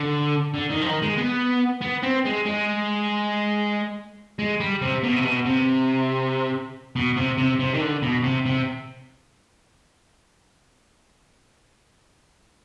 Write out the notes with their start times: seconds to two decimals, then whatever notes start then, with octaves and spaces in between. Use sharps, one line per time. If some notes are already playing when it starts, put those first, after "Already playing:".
Already playing: D3
0.54 D3
0.70 D#3
0.81 F3
0.86 D#3
1.02 G#3
1.18 B3
1.82 B3
2.03 C4
2.25 G#3
2.46 G#3
4.39 G#3
4.60 G3
4.82 C3
5.03 B2
5.16 C3
5.24 B2
5.46 C3
6.96 B2
7.16 C3
7.38 C3
7.60 C3
7.74 D#3
7.81 D3
8.02 B2
8.23 C3
8.46 C3